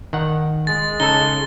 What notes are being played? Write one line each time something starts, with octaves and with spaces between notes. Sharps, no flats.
D#3 F#5
G#3 A6
C#3 D#4 A4 G7